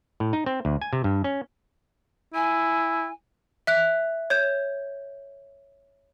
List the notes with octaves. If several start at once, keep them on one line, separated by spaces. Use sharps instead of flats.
A2
D#4
C4
D2
G#5
C3
G2
C#4
E4 G#5
E5 F#6
C#5 G6